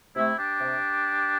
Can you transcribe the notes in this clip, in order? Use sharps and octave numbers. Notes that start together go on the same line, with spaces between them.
C3 A3 E4
D4 G4
C3